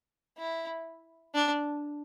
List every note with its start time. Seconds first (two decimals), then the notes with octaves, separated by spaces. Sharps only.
0.38 E4
1.35 D4